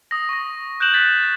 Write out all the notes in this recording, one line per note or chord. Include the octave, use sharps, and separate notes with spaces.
D#6 A#6
C#6 D#6 A#6
F#6 G6 D7 E7 F#7
A6 B6